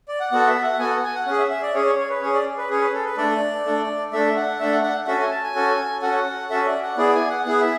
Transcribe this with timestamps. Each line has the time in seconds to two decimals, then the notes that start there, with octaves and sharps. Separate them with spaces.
0.08 D5
0.20 F#5
0.32 B3 F#4 A4 F#5
0.47 E5
0.63 F#5
0.79 B3 F#4 A4 G#5
0.91 F#5
1.04 G#5
1.15 F#5
1.26 C#4 G#4 F#5
1.39 E5
1.50 E5
1.63 D5
1.74 C#4 G#4 C#5
1.87 C#5
1.98 C#5
2.10 B4
2.22 C#4 G#4 C#5
2.34 D5
2.58 B4
2.70 C#4 G#4 C#5
2.81 B4
2.93 A4
3.05 B4
3.17 A3 D4 A4 D5
3.65 A3 D4 A4
4.12 A3 D4 A4 E5
4.36 F#5
4.60 A3 D4 A4 E5
4.72 F#5
4.83 F#5
5.07 C#4 F#4 A4 E5
5.20 G#5
5.31 A5
5.43 G#5
5.55 C#4 F#4 A4
6.02 C#4 F#4 A4 F#5
6.50 C#4 F#4 A4 E5
6.66 D5
6.82 F#5
6.97 B3 E4 G#4 D5
7.14 G#5
7.30 F#5
7.45 B3 E4 G#4 F#5
7.61 E5